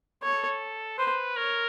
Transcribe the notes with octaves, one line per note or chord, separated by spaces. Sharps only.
A4 C#5
B4 C5
A#4 C#5